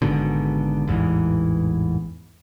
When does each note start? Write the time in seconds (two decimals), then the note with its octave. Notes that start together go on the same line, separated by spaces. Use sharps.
0.02 G#1 G#2 B2 D3
0.87 A1 E2 G#2 E3